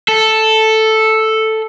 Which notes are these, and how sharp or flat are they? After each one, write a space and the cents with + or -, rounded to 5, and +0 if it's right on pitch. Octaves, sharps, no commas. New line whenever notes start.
A4 +0